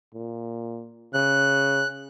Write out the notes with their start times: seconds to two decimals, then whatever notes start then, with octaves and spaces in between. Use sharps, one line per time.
0.15 A#2
1.14 C#3 F#6